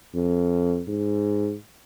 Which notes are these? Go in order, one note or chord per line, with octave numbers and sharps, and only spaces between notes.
F2
G#2